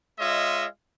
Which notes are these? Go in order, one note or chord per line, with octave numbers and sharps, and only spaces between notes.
G#3 F4 C#5 D#5 E5